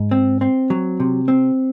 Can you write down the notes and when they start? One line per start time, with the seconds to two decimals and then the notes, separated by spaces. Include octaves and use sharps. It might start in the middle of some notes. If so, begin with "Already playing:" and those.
Already playing: G#2
0.11 C4
0.41 C4
0.70 F#3
1.00 C3
1.28 C4